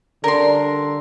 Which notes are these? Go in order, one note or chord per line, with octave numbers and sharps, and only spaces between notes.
D3 G3 D4 A#4 C6